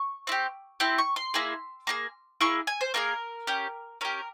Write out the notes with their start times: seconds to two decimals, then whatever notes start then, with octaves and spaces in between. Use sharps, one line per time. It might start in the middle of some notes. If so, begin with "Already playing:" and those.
Already playing: C#6
0.27 C4 E4
0.32 G4
0.80 C4 E4 G4
0.98 C#6
1.16 C6
1.34 A#3 E4 G#4
1.87 A#3 E4 G#4
2.41 A#3 E4 G#4 C#6
2.67 G#5
2.81 C5
2.94 A#3 E4 G#4 A#4
3.47 C#4 G4
4.01 C#4 G4 A#4